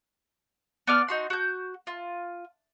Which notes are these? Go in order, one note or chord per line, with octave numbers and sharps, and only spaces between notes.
B3 D5 F6
D#4 F#4 C6
F#4 G6
F4